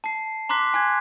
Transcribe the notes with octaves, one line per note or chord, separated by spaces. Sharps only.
A5 C7
A#5 C6 D6 F#6 B6
G#5 C6 F#6 G#6